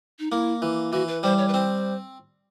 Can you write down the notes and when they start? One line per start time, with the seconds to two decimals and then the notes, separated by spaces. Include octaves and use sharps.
0.19 D#4
0.31 A#3 E4
0.62 E3
0.93 E3 F#4
1.08 B4
1.23 G3 C5
1.38 C#5
1.48 B4
1.53 C4 C5